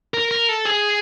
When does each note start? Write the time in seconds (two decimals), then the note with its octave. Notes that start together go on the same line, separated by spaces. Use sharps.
0.14 A#4
0.31 A#4
0.49 A4
0.65 G#4